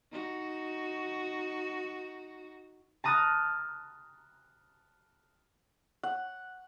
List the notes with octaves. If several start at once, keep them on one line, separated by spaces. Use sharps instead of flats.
D#4 F#4
A5 A#5 D#6 F6 F#6 A6
F#5